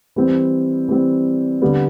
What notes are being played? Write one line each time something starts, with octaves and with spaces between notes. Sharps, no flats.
E3 G3 C4
E3 G3 C4
D3 G3 B3